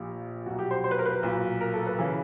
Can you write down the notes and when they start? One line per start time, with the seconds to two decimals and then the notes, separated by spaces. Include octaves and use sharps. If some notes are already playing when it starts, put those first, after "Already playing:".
Already playing: A#1 A#2 G4
0.46 B1 B2 F#4
0.59 G4
0.71 C5
0.84 C5
0.91 B4
0.99 A#4
1.06 B4
1.23 B1 A#2
1.61 A#4
1.74 A4
1.87 B4
1.99 C#3 E3